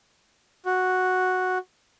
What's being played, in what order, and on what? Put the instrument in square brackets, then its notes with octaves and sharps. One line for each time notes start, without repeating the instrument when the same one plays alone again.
[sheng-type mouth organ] F#4